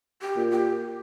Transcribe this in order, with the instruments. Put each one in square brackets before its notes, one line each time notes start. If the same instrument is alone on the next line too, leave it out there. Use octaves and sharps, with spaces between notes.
[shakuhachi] G4
[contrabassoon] A#2
[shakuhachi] G4